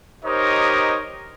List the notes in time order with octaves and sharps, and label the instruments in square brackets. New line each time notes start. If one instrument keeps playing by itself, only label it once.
[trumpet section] D#4 G4 A#4 C5 C#5 D#5